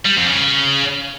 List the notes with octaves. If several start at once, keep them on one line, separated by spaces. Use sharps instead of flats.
G3
F2
C#3